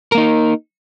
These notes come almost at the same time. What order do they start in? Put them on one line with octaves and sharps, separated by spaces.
A#4 A#3 D#4